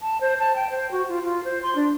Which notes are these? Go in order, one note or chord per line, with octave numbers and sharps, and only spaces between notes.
A5
C5
A5
G5
C5
F#4
F4
F4
C5
C6
D4